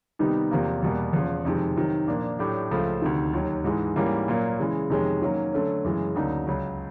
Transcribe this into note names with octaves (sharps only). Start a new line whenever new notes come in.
C3 D#3 G3 B3 D#4
E2 C3 F3 A#3
E2 B2 G3 A#3
E2 C#3 F3
F2 C3 D#3 G#3
C3 D#3 F#3
A#2 F3 A#3 D4
A2 F#3 A3 D4 G4
C#2 C#3 F3 A3
D2 C3 D#3
D#2 D#3 F#3
G#2 E3 G#3
G#2 E3 G3 A#3 C#4
A#2 F#3 A#3
C#3 E3 G#3
F2 C3 D#3 G#3 C#4
D#3 F#3 A#3 C#4
D3 F#3 A3 C#4
F#2 C#3 E3 G#3
D2 C#3 F#3 A#3 D#4
C#2 C#3 F#3